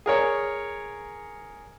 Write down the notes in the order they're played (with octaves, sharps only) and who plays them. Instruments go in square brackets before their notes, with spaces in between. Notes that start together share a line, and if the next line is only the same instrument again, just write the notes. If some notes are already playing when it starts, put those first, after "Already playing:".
[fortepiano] G#4 A#4 C#5